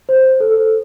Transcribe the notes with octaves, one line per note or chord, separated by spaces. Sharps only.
C5
A4